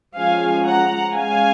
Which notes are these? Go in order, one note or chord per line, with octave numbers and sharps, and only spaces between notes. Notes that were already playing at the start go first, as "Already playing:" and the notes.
F3 G#3 C#4 F5 G#5
F#5 A#5
G#3 C#4 F5 G#5